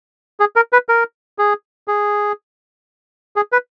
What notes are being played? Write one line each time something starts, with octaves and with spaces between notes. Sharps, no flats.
G#4
A#4
B4
A#4
G#4
G#4
G#4
B4